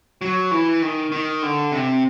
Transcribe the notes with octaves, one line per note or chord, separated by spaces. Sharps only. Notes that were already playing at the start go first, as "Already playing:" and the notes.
F#3
E3
D#3
D#3
D3
C3